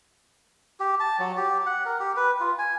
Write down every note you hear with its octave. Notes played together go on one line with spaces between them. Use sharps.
G4
A5
F#3
G4
F#5
A#4
G4
B4
F4
G#5